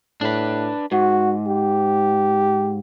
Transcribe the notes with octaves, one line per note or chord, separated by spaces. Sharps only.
A2 D4 B4
G#2 F#4
G4